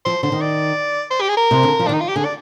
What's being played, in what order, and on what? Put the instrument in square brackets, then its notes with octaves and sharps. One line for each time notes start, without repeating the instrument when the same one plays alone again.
[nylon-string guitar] F3 [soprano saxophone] C5
[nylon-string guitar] D3 [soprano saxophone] C5
[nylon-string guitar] D#3
[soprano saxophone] D5
C5
G4
G#4
A#4
[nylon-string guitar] C3
D3
F3
[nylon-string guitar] D#3 [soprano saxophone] D4
[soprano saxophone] D#4
F4
G4
[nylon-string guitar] D3 [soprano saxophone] G#4
[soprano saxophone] D5